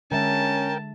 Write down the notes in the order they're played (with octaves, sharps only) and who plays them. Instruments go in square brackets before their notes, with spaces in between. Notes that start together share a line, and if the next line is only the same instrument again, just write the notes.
[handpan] D3 G#3 E5 [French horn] C#4 [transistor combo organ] A#4 G5 [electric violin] A5